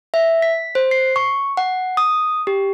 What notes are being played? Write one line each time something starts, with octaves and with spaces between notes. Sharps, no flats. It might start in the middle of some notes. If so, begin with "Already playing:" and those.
E5
B6
C5
C7
C#6
F#5
D#6
G4